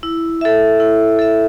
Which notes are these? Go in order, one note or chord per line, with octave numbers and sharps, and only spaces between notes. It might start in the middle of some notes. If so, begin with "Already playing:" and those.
E4
A4 E5
E4
A4 E5